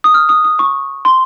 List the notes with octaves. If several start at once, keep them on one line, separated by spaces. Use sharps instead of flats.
D#6
F6
D#6
D#6
C#6
C6